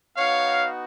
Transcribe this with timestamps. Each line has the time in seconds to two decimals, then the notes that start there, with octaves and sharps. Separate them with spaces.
0.16 B3 D#4 F#4 C#5 F5